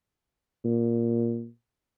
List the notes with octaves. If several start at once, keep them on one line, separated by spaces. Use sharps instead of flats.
A#2